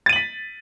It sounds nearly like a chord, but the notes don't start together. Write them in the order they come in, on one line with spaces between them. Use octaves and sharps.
A6 D#7 F#7 B6